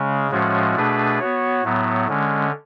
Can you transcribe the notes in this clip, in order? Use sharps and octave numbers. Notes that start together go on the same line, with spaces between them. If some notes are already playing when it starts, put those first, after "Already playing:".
Already playing: C#3 G#3 C#4
A2 F3 G#3 C#4 F#4
B2 A3 D4 G#4 B4
B3 F#4 C#5
A2 F#3 B3
D3 G#3 C#4